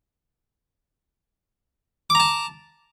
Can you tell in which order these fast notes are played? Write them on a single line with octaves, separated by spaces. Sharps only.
D6 A#5 A5